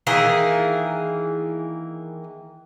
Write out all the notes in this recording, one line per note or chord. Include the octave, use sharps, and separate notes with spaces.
D#3 E3 A#3 G#4